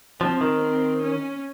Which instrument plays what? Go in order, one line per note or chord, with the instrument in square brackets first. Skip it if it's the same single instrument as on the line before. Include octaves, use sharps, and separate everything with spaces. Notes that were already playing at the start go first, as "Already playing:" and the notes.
[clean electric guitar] F3 [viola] C4
[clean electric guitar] D#3
[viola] C4
C#4